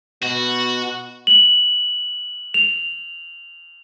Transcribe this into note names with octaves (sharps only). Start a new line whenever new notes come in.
B2 F#4
F#7
F7